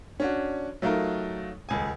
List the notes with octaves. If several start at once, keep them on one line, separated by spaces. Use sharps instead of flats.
C#4 D4 F#4
F#3 A3 D#4 F4 A#4
D#1 C#2 G#5